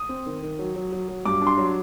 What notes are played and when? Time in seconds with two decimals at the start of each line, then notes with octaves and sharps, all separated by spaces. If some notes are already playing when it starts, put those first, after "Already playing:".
Already playing: D#6
0.09 C4
0.26 D#3
0.42 D#3
0.59 F#3
0.76 F#3
0.92 F#3
1.09 F#3
1.25 G2 D6
1.42 D4
1.47 C6
1.58 F#3